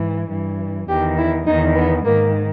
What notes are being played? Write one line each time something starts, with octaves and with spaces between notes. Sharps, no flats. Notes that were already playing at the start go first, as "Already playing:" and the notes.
Already playing: G#2 E3
G2 E3
E2 D#3 G4
E4
E2 D#3 D#4
B3
G#2 D#3 A#3